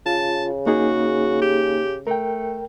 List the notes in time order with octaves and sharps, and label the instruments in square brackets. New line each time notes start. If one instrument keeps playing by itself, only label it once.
[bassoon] C#3 [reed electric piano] F4 [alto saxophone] A5
[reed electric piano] A#3 D#4 G#4 [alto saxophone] F#4
[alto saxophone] G4
[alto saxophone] A3 [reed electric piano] A#4 G5